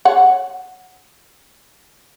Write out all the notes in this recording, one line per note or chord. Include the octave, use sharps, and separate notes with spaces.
C#5 F#5